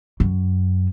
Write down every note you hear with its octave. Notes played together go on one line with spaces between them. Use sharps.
F#2